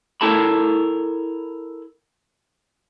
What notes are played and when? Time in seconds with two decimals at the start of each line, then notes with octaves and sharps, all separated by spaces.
0.21 E4 A4 A#4 A5 B5